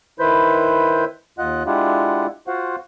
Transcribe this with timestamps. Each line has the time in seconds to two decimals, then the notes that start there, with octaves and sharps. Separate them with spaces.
0.19 D#3 E4 B4 C5 B5 G6
1.38 D#2 F4 D#5 F#5 F#6
1.66 G#3 D4 E4 F4 G4 F#5
2.48 F4 F#4 C5 F5 F#5